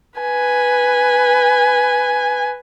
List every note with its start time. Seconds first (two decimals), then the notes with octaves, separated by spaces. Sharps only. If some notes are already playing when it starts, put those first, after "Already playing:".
0.20 B4 G#5